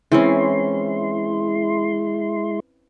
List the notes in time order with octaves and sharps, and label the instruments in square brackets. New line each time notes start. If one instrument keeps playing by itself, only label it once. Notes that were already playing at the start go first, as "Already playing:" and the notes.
[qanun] E3 C4 C#4 [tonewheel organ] G#3 E4 C6